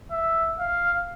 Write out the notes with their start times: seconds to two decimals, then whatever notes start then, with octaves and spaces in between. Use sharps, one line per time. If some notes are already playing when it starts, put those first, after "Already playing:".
0.11 E5
0.60 F5